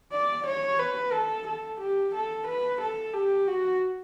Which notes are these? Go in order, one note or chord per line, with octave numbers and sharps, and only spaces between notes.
D5
C#5
B4
A4
A4
G4
A4
B4
A4
G4
F#4